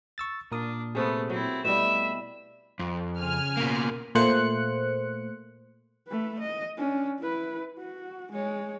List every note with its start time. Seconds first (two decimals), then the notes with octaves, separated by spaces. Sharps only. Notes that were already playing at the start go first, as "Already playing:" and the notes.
0.18 C#6 E6 A6
0.52 A#2 D4 A#4 D#6
0.95 C3 A3 B3 G#4
1.30 F#3 C4 E4
1.65 B2 G3 A3 E4 E5 B5 E7
2.79 F2
3.20 C#3 G#5 F6
3.57 B2 A#3
4.15 A#2 A3 A#3 C5 F#6 C#7
6.07 A3 B4
6.40 D#5
6.77 C#4 D4
7.19 E4 B4
7.79 F#4
8.32 G#3 C#5